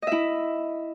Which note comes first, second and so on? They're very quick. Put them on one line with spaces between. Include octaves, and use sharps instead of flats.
D#5 E5 E4